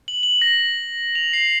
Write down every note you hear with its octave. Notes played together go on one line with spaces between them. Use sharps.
F#7
F#7
A#6
F7
C7